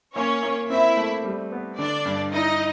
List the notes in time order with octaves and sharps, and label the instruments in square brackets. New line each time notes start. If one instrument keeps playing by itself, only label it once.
[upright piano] A#3 [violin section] C#4 C#5
[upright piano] A#3
[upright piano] C4 [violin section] E4 E5
[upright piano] A3
G3
B3
[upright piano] D3 [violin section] D4 D5
[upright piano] G2
[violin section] D#4 D#5 [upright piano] E4